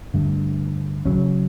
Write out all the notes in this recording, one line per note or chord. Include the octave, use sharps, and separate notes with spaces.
G2 D3 A3
C#3 F#3 C#4